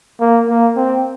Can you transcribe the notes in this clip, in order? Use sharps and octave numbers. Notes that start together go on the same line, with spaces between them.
A#3
A#3
C4